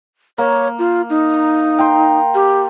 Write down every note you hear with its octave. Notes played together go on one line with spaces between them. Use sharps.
A#3 C#5
F4
D#4
G5 A#5 C6
G4